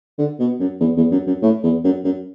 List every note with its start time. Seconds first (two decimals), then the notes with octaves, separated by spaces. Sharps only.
0.18 D3
0.39 B2
0.60 F#2
0.80 E2
0.96 E2
1.11 F#2
1.27 F#2
1.42 A2
1.63 E2
1.84 F#2
2.04 F#2